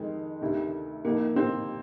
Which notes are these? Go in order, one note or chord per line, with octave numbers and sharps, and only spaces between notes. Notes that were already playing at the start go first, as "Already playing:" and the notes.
Already playing: F2 D#3 G#3
D2 C3 D#3
F2 D#3 A#3
C4